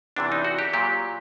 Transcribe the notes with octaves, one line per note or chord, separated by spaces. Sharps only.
E2 C3 E3 D4
D#4
F#4
G4
A#2 F#3 G4